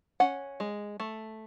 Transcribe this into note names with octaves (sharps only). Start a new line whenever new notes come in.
C#4 F#5
G#3
A3